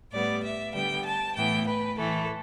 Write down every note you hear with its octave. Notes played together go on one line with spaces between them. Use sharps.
A2 G3 B3 D5
E5
D3 G3 B3 G5
A5
A2 E3 B3 G5
B4
A2 E3 A3 A4